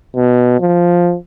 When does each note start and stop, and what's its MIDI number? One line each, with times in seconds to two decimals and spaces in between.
0.15 0.57 47
0.60 1.16 53